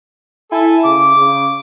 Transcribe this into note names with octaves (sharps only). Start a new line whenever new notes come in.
E4 A4 G#5
C#3 D6
C#3